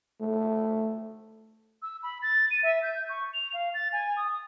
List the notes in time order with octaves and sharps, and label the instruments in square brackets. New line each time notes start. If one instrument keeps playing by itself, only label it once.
[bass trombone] A3
[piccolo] E6
B5
A6
D#7
E5
G6
C#6
F7
F5
A6
G#5
D#6